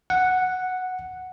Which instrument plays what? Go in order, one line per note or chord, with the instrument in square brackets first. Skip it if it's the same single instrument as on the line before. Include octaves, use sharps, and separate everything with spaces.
[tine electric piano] F#5